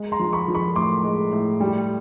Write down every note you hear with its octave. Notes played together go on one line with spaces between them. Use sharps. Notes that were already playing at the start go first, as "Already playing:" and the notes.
Already playing: G#3
A#5 C6
F3
B5 C#6
F3
B5 C#6
A2 C6 D6
G#3
A2
G3